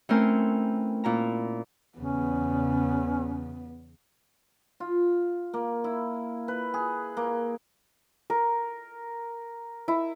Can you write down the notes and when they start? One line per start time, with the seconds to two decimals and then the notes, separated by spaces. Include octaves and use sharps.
0.09 E3 A3 C4 C#4 A#4 C5
1.04 A#2 E4 A#5
1.98 E2 C#3 B3 C#4
4.80 F4
5.54 A#3
5.84 E4
6.48 B4
6.74 G#4
7.17 A#3
8.30 A#4
9.88 E4